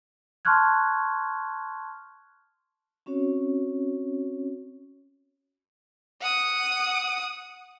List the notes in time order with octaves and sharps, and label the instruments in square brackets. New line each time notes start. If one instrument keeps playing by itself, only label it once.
[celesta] A5 C6 C#6 F6 F#6 G#6
[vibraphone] C4 C#4 F#4 C#5
[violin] F#5 D#6